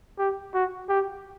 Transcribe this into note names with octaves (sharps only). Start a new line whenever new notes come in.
G4
F#4
G4